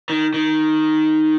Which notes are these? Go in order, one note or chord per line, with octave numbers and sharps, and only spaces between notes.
D#3
D#3